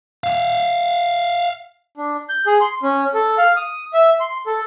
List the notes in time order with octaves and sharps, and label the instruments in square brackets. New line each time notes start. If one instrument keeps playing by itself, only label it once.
[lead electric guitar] E5 F5
[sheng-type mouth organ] D4
G6
G#4
C6
C#4
A4
F5
D#6
E5
C6
A4